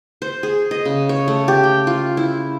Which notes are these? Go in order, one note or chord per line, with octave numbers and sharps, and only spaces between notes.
C5
G#4
D#5
C#3
C#5
A3
G4
G5
F4
E4